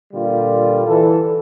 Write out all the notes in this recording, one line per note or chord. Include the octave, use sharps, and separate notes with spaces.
A#2 D3 G3 F4
E3 A4